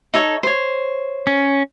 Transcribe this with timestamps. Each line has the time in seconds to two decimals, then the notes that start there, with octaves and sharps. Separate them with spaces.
0.14 D#4 A4 C#5
0.43 C5 C#5
1.27 C#4